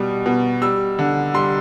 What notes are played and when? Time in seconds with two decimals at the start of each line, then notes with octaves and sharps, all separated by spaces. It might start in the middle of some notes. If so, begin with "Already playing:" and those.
Already playing: B2 G3
0.26 B2
0.62 G3 E6
0.99 D3
1.34 G3 C6